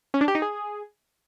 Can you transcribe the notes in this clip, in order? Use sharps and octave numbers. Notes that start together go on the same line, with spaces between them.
C#4
D4
G4
D#4
G#4